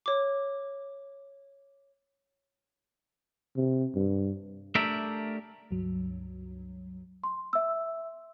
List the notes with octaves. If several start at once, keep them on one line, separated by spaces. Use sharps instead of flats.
C#5 D6
C3
G2
A3 D4 G4 A#4 D5 E5
C#2 G2 F#3
C6
E5 E6